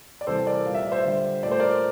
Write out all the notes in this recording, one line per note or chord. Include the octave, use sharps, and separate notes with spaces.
D5
C3 E3 G3 A4 C5
A#4 D5
A#2 G3 F5
E5
D5
C5 E5
D3 G3
A#2 A3 D5
C5
A#4 D5